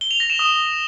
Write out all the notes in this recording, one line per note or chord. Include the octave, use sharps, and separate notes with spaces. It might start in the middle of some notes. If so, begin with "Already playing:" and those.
G7
F7
A#6
E7
D#6